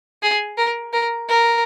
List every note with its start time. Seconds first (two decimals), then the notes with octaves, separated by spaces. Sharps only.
0.23 G#4
0.58 A#4
0.93 A#4
1.29 A#4